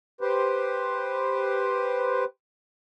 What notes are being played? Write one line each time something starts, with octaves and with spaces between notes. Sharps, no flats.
G4 B4 C5